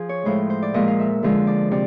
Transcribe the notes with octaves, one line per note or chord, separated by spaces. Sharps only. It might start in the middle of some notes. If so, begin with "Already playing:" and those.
Already playing: F3 G#4
C#5
A2 F3 G#3 C5
C5
D5
A#2 F3 G#3 D#5
F5
E5
D3 F3 G#3
D5
C3 D5